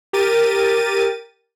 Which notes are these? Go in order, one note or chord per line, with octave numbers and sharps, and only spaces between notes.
G4 A#4 A6 D#7